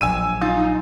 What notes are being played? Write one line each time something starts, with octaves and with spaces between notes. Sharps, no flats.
A#1 F#3 G#5 E6 D#7
D#4 F4